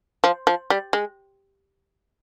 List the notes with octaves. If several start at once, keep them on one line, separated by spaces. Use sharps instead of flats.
F3
F3
G3
G#3